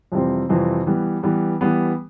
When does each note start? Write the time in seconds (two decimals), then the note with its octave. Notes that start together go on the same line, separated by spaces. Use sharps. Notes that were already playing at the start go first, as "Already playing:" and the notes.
0.12 F2 C3 E3 G3 C4
0.49 F2 C3 E3 G3 C4
0.86 E3 G3 B3
1.23 E3 G3 B3
1.61 E3 G3 B3